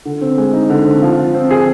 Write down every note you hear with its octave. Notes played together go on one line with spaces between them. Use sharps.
D3
C4
G#3
D#4
D3
C4
F3
F4
C4
G#4